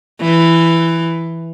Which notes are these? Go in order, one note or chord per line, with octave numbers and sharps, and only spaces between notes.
E3